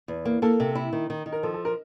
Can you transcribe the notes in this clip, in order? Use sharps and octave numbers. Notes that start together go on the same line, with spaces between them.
E2
A#3
A#3 A4
C3
E4
D#3
D#3
D#3
A#4
F3 A4
A4
A#4